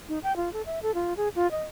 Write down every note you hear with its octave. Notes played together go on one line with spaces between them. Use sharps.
D#4
G5
F4
A4
E5
A4
F4
G#4
F4
D#5